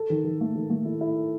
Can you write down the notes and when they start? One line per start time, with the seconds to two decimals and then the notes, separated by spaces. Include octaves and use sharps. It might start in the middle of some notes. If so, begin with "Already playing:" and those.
Already playing: A4
0.10 D#3
0.24 D#3
0.41 A3
0.55 D#3
0.70 A3
0.85 E4
1.01 E4